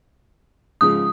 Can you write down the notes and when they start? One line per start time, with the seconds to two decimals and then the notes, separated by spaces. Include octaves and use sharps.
0.81 G#2 C#3 F3 D#6